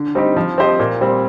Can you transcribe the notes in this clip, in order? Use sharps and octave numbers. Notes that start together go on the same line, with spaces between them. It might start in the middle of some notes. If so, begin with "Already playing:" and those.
Already playing: D3
G3 C4 D#4 G4
F3
C4 G4 C5 D#5
A#2
G3 C4